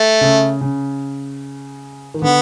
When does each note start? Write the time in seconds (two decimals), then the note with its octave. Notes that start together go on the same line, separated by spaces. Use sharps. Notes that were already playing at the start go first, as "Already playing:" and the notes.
Already playing: A3
0.21 C#3
0.61 C#3
2.14 D#3
2.22 D3 B3